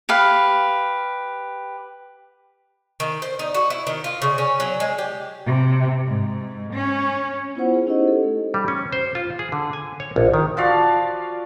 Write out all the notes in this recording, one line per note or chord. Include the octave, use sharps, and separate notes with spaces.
G4 B4 F5
D#3
C5
D#4
F#4
E4
D#3
F4
C#3
C#4
F#3
G#3
G4
C3
G#2
C#4
B3 E4 F4 C5 F#5
G#4
C#4 D#4 E4 G4 C5 D#5
A4
A3
G3
C#4
C5
F4
G#4
D3
G#5
C#5
A#1
D#3
F3 F#4 D5 F5